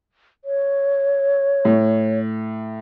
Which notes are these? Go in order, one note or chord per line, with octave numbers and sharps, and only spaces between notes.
C#5
A2